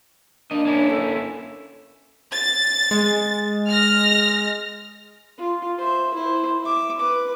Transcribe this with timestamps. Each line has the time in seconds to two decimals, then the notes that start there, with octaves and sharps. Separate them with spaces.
0.51 A#3 D4 D#5
0.65 A#3 C#4 E4
0.91 A4
2.31 A6
2.91 G#3
3.69 F6 A#6
5.38 F4
5.78 C5 E5
6.14 E4 C5
6.63 E5 D6
7.00 B4 D6